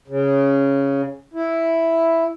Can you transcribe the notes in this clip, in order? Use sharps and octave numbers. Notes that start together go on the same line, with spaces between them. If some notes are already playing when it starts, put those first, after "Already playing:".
C#3
E4